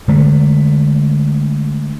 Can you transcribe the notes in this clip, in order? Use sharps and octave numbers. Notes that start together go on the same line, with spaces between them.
D3 G#3 A3